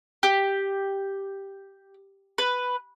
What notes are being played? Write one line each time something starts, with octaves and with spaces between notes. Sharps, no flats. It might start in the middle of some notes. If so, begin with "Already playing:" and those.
G4
B4